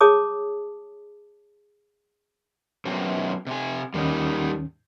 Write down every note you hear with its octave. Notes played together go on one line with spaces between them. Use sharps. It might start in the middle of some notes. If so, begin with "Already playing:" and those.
G#4 C#5 A5 D6 D#6
F#2 B2 C4
C3 G#5
D#2 D#3 G3 A#3 C#4 D#4